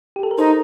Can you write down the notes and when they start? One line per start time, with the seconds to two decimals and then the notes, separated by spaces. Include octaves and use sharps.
0.16 G4
0.23 A4
0.31 A#4
0.38 D#4 A4 C5